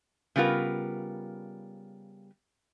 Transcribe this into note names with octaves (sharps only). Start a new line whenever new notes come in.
C#3 G3 B3 F4 A#4